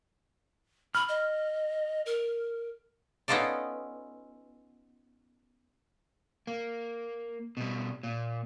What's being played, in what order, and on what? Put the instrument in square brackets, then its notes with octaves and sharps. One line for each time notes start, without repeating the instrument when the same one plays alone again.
[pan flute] B5 [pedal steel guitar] F6
[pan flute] D#5
A#4
[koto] B3 C#4 D#4 F4 A4 D5
[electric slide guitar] A#3
B2 G3
A#2